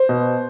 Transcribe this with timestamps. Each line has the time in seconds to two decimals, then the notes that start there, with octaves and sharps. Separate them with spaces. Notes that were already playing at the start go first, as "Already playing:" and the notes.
Already playing: C5
0.09 B2